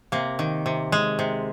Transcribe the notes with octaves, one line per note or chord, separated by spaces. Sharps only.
C3 A#3
D#3
C3
G#3
C3